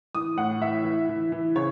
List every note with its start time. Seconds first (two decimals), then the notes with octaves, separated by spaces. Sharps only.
0.15 E3 D#6
0.37 A2 F#5
0.61 E3 E5
0.84 E3
1.09 E3
1.32 E3
1.55 C#3 C#5